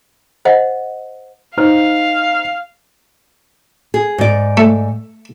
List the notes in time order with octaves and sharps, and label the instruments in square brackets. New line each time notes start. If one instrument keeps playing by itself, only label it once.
[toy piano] C5 D#5 F#5
[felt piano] D#4 C5 F6 [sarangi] F5
[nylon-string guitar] G#4
G#2 D5
[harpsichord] A3